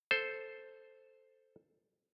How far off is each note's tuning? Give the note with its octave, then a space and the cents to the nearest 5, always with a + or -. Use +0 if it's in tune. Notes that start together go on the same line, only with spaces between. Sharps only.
A4 +0 C5 +0